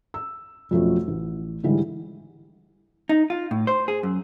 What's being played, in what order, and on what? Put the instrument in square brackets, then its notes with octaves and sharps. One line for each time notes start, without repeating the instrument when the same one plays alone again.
[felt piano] E6
F2 B2 F3 F#3 A3 C#4
A1
G#2 D3 E3 G3 G#3
[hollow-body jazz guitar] D#4
F4
A2
C5
G#4
F#2